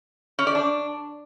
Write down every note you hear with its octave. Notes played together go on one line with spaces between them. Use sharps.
C#4
D5
D4